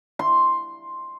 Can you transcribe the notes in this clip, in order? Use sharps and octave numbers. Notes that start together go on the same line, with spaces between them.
C6